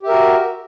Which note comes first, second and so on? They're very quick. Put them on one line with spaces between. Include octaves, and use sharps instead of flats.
G4 E5 A#4 F#4